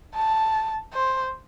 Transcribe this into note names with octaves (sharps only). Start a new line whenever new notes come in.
A5
C5